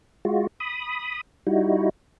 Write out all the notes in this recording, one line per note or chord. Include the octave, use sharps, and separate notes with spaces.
G#3 F4 F#4
B5 D#6
G3 D#4 E4 F#4